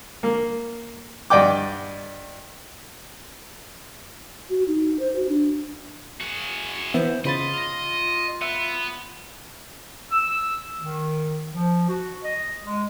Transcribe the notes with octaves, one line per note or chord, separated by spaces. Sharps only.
A#3
G2 D5 D#5 F#5 G5 D6
F#4
D#4
C5
F#4
D4
F#4 G#4
E3 B3 C5 E5
C#3 F4 D#5 B5 A6
F6 A#6
B3 E5
E6
D#3
F3
F#4
D#5
G#3